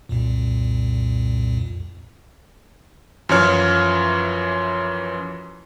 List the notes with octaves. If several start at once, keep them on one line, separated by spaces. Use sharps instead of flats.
C2 F2 A#2
F#2 E3 F3 C#5 F6